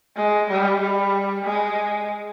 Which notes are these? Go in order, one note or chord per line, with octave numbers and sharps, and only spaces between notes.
G#3
G3
G3
G#3